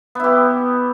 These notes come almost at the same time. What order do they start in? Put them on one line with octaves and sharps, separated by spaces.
B3 E4 G4